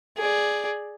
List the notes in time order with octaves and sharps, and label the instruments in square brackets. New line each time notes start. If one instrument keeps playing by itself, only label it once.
[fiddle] G#4 D5